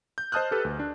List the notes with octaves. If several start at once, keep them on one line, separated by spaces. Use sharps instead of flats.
G6
C5 D#5 A5 D#6 F6 F#6
G4 A4 B4
D2
D4